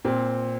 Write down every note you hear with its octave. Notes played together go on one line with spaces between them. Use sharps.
A#2 C4